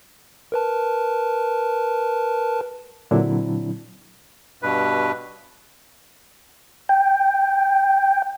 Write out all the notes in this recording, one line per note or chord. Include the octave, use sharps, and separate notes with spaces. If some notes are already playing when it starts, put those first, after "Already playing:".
A#4 B4 A5
A#2 D3 F#3 C4 D4 E4
G2 B2 B4
G5